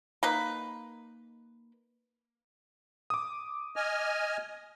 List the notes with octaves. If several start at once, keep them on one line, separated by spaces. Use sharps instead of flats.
A#3 D#4 B4
D6 D#6
D#5 G#5 F6